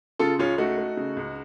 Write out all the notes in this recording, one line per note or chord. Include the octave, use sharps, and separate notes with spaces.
C#3 F4 A4
C#2 C#4 F4
A3 D#4 F#4
A3
C#3
C#2